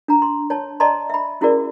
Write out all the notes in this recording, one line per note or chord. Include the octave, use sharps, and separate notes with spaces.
D4 A#5
C6
C#5 A5
D5 D#5 A5 A#5 C6
E5 B5
C#4 E4 F#4 G#4 A#4 D5